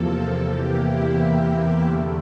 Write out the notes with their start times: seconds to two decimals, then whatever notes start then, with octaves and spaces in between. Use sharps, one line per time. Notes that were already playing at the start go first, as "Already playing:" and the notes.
Already playing: E2 C3 F3 A#3 A4
0.48 E2 C3 E3 A#3 G4
0.82 E4
1.85 E2 D3 A3